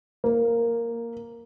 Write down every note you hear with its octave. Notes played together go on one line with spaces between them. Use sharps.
A#3